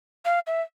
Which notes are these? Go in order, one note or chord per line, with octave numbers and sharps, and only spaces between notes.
F5
E5